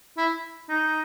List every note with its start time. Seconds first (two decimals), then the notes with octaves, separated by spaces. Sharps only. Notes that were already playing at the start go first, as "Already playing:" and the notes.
0.18 E4
0.69 D#4